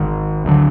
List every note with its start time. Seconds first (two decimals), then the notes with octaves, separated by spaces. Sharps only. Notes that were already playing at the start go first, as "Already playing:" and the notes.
Already playing: G#1 G#2 D#3
0.45 D2 D3 F#3 D4